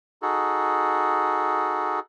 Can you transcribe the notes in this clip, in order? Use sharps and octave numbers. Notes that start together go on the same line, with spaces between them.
D#4 F#4 G#4 A4